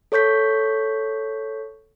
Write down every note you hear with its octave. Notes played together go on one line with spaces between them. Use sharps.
A4 C#5 C#6 G6 B6